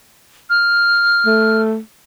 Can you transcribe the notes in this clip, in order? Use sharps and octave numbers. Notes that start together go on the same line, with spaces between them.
F6
A3